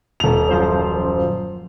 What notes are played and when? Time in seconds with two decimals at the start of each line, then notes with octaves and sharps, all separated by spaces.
0.20 D#1 F7
0.48 F#2 F3 C5